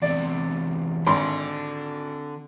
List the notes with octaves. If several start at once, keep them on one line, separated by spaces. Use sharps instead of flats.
E2 C3 D5
G#1 D3 C6